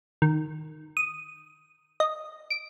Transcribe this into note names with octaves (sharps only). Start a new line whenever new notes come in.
D#3
D#6
D#5
D7